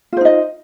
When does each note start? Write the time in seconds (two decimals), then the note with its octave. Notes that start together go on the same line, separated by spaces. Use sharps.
0.13 F4
0.17 C5
0.21 D#4
0.25 D#5